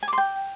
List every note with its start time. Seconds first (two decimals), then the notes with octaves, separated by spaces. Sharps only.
0.03 G#5
0.08 D6
0.13 C6
0.18 G5